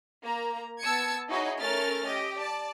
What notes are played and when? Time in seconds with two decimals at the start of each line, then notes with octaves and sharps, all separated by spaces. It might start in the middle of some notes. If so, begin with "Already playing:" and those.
0.23 A#3 A#5
0.82 B3 A5 E6 G#6 C#7
1.29 D#4 E4 F#4 G#4 C#5 D#5
1.60 A3 C#4 A4 A#4 F6 A6
2.07 G4 D#5
2.39 D5 A5